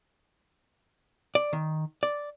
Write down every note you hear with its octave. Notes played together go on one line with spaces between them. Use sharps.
D5
D#3
D5